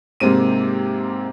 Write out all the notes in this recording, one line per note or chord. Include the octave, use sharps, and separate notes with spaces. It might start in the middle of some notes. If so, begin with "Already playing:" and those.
G#2 C3 A#3 C4 D#7